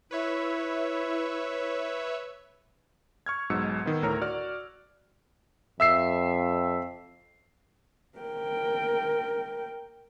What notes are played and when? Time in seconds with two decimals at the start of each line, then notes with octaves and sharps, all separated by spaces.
0.11 E4 B4 C#5 E5
3.26 C#6 F6 G#6
3.50 B1 G#2 B2 F#3 E6 C#7
3.86 D#3 B3
4.03 D2 A2 A#4 C#5 A#5 F6
4.21 F#4 D5 F6
5.80 F2 E5 E6 C7
8.18 A#4 G5